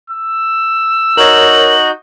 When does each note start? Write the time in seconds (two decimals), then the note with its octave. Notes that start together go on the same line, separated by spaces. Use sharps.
0.10 E6
1.17 D#4 F#4 A#4 C#5 G6 F#7